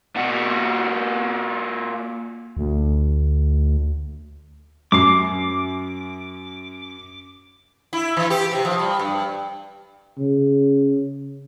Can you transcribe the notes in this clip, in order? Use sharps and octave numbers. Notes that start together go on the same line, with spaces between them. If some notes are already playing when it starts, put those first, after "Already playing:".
A#2 F#4
D2
F#2 D6 C7
E4
E3
G4
C3
F3
G3
G2
C#3